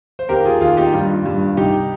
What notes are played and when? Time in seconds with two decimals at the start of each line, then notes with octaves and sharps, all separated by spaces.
0.19 C5
0.29 D#2 G4 A#4
0.45 F4 G#4
0.61 D#2 F4 G#4
0.77 D#4 G4
0.93 G2 F4
1.25 G2
1.57 C2 D#4 G4